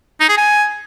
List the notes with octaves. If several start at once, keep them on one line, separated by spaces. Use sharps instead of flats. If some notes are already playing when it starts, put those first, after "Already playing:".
D#4
G#4
G#5